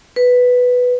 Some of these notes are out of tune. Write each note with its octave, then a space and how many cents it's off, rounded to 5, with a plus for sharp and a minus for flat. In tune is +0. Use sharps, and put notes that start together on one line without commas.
B4 +0